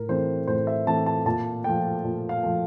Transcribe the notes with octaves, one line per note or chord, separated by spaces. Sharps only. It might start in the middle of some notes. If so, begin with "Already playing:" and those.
Already playing: A2 A#4
E3 A3 C4 C5
A2 C5
E5
E3 A3 C4 A5
A5
A#2 A5
F3 A3 G5
A#2
F5
F3 A3